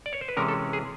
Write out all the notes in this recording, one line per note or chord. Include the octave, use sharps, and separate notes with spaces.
D5
C#5
C5
B4
C3 E3 G#3 C#4 A#4
A4
G#4